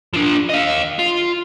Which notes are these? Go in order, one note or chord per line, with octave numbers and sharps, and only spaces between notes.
F3 D4
D#5 F5
F4